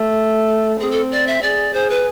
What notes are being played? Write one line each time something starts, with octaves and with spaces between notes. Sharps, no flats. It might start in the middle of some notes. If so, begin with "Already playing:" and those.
Already playing: A3
C4 G#4
A4
D5
E5
G#4 D5
G#4 C5
B4